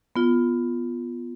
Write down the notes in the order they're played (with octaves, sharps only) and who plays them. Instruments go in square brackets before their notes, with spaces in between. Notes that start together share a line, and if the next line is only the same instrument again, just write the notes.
[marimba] B3 F4